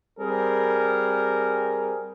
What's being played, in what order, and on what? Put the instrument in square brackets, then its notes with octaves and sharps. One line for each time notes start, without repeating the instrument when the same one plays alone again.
[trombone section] G3 C4 G#4 A#4